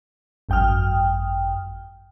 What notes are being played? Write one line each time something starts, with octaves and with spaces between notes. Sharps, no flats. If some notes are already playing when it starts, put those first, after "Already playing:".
G#1 F#2 G5 D#6 F6